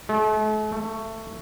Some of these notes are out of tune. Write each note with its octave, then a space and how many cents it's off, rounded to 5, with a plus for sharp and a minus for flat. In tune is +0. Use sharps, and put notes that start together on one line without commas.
A3 -40
A3 +20